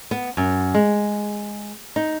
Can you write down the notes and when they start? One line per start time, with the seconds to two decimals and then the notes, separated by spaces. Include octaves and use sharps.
0.11 B3
0.37 F#2
0.74 G#3
1.96 D#4